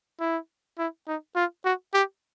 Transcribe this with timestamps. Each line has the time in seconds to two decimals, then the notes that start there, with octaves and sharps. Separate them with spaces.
0.20 E4
0.78 E4
1.07 D#4
1.36 F4
1.65 F#4
1.94 G4